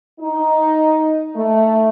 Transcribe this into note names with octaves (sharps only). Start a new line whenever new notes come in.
D#4
A3